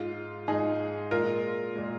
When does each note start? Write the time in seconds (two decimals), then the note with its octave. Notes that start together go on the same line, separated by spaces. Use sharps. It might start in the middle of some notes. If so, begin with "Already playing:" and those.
Already playing: G#2 G#3 F4
0.48 G#2 G#3 D#4 G#4
1.11 A#2 G#3 F4 A#4
1.75 A#2 G#3